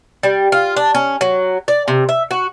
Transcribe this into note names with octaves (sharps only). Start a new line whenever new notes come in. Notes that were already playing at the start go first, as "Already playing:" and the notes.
G3
F4
D4
C#4
F#3
D5
C3
E5
F#4